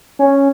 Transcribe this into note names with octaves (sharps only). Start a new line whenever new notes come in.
C#4